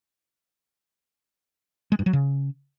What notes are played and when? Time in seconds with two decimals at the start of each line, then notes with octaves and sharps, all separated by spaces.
1.92 G#3
1.99 G2
2.06 F#3
2.13 C#3